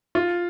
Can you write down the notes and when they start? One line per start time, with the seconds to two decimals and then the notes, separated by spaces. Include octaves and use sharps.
0.15 F4